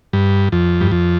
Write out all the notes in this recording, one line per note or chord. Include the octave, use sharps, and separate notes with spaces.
G2
F2
G2
F2